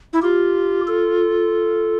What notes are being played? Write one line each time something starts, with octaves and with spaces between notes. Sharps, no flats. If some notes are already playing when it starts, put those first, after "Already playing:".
E4
F4 G4
A4